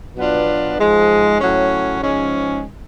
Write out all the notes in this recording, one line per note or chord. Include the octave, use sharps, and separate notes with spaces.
B2 F#3 B3 D4 F4
G#2 F3 G#3
A2 F#3 C#4
G#2 F3 G#3 C#4